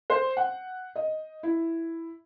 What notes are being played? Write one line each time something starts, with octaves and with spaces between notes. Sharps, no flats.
C5
F#5
D#5
E4